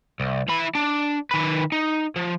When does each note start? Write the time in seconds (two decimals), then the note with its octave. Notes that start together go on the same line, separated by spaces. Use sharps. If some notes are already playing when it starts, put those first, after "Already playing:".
0.20 C2
0.49 E3 B5
0.75 D4
1.31 D#3 B4
1.72 D#4
2.16 F3